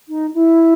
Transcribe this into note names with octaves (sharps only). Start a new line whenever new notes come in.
D#4
E4